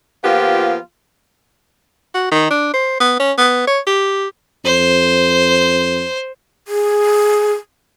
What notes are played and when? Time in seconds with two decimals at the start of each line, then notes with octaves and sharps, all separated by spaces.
0.24 F3 A#3 B3 F4 G4
2.14 F#4
2.32 D#3
2.51 D4
2.74 C5
3.00 B3
3.20 C#4
3.38 B3
3.67 C#5
3.87 G4
4.65 F2 C5
6.68 G#4